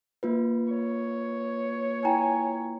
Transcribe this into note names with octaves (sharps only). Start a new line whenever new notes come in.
A#3 F4 B4
C#5
E4 G5 G#5 A#5